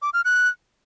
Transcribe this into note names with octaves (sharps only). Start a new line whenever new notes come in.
D6
F6
F#6